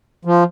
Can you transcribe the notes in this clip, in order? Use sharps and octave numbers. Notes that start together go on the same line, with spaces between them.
F3